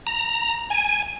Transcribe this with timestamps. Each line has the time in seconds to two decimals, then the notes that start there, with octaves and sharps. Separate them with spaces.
0.07 A#5
0.70 G#5